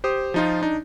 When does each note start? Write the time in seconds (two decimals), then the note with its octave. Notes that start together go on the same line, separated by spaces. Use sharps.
0.04 G4 C5 D#6
0.34 F3 D#4 F4
0.62 D4 D#4